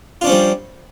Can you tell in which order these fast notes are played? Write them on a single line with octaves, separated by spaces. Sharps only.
F4 D4 C#4 F3 G3